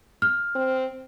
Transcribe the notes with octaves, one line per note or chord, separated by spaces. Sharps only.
F6
C4